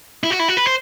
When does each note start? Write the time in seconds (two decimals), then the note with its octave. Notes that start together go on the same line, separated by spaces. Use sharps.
0.23 E4
0.31 F#4
0.39 E4
0.48 F#4
0.57 B4
0.66 C5